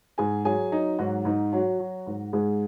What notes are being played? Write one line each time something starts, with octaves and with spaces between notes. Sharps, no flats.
G#2 G#4 G#5
F#3 G#4 G#5
F#3 D#4 D#5
G#2 F#3 F#4
G#2 D#4
F#3 F#4
F#3
G#2
G#2 G#3 G#4